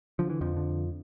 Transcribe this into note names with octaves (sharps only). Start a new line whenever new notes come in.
D3 F3
E3
F2 F3
D3